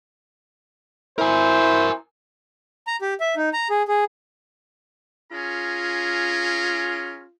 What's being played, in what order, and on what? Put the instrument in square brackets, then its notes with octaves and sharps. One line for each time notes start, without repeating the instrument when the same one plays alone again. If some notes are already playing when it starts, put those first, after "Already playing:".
[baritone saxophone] E4 [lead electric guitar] A#4 G#5 [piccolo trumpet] C5
[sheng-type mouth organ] A#5
G4
E5
D#4
A#5
G#4
G#4
[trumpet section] C#4 G#4 A#5 [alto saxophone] F4